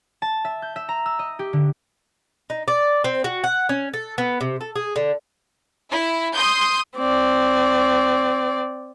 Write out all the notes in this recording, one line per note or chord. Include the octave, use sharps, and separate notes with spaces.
A5
E5
G6
E5
A#5
E6
D#5
G4
D3
D#4
D5
C4
F#4
F#5
C#4
A4
B3
C3
A4
G#4
D3
E4
C6 D#6 G6
C4 D5